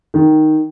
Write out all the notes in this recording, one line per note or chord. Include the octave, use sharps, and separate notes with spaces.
D#3